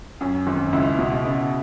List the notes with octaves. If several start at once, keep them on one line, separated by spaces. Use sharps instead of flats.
F#2 C#4
G#1
C#2 E4
B2
C#3